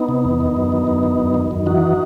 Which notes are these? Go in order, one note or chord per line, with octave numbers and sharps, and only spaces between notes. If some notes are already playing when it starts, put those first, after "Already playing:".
Already playing: B3 D#4
C3
E2
D#3
F#2
D#3
F#2
D#3
F#2
D#3
F#2
E3 D#4 F#4